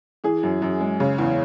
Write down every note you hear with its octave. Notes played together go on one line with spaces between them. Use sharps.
E3 G#4
F#2
F#2
G#3
C#3
E2